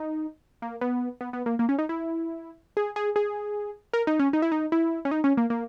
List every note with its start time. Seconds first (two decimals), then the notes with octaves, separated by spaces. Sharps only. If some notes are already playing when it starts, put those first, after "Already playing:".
Already playing: D#4
0.62 A#3
0.81 B3
1.21 B3
1.33 B3
1.46 A#3
1.59 A#3
1.69 C#4
1.79 D#4
1.89 E4
2.77 G#4
2.96 G#4
3.16 G#4
3.93 A#4
4.07 D#4
4.19 C#4
4.33 D#4
4.42 E4
4.52 D#4
4.72 E4
5.05 C#4
5.11 D#4
5.24 C#4
5.37 A#3
5.50 A#3